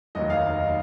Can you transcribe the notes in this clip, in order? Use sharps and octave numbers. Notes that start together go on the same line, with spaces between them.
F1 D#2 D#3 F#3 D#5
F5